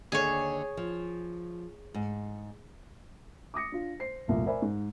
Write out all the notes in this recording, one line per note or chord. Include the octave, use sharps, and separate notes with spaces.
D#2 D3 G#4 C#5 F5
F3
G#2
D6 D#6 A#6 C#7
D4 F4
C5 C7
F1 C2 A#2
A#4 C5 D5 E5 G#5 B5
G#2